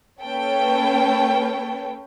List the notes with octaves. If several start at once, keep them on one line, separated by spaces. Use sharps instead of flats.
A#3 C#4 A4 B4 C#5 G5